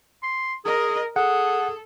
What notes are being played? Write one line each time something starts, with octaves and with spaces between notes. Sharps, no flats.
C6
G#4 A#4 D#5
G#4 A4 F#5